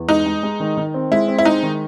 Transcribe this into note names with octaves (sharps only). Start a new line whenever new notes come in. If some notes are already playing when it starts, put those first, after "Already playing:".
Already playing: E2
G#3 D#4
G#3
G#3
D#3
D#3
C4
G#3 E4
C4
E4
G#3 D#4
D#3